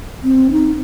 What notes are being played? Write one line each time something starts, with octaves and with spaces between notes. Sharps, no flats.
C4
D#4